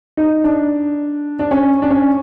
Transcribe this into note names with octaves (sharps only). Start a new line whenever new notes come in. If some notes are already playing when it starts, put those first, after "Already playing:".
D#4
D4
D4
C#4
D4
C#4